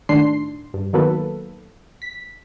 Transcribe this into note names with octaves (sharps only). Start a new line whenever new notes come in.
G#1 A2 D#3 D4 C6 C7
G2
D#3 F#3 A#3 B3 A4 B4
B6